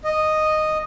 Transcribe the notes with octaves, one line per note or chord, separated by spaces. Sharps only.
D#5